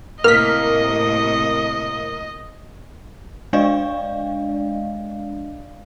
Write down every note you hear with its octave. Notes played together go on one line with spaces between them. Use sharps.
A2 C3 A3 A#3 D#5 F6 B6
G#3 D4 D5 D#5 F5